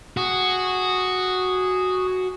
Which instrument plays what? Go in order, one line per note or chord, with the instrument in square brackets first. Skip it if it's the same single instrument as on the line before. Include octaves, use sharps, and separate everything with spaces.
[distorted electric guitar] F#4 [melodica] G#4